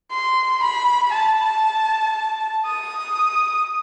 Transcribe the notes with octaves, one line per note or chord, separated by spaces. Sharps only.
C6
B5
A5
D#6